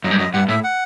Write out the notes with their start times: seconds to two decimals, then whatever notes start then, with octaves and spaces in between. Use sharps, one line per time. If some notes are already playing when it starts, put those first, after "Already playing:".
0.04 F#2 D#5
0.11 G2
0.19 F#2 D#5
0.33 G2 F#5
0.48 A2 E5
0.64 F#5